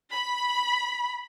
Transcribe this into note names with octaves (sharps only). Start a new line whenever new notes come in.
B5